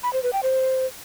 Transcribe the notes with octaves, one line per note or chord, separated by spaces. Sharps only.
B5
C5
B4
G5
C5